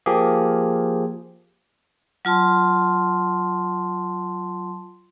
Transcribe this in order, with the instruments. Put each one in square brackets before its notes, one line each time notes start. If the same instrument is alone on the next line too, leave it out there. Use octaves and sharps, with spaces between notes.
[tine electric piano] F3 A#3 G4 G#4
[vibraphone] F#3 F4 A5 C6